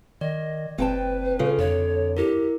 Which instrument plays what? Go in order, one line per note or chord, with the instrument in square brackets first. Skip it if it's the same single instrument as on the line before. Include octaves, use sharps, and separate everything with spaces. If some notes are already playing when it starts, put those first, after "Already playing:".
[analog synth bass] D#3 [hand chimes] D5 [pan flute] D#5
[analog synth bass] F#1 [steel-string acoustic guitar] C4 G5 A5 [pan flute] B4
[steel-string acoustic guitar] C#3 F4 [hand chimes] A4
[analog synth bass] F2 [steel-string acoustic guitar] D3 [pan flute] C#5
[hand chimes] E4 A#4 [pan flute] G4